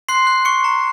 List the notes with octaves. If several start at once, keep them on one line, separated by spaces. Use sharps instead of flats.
C6 F#6 C7
F#6
C#6 F#6 C#7
A#5